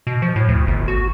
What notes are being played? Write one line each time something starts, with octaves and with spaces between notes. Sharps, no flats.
B2
F3
A2
D2
G1
F#4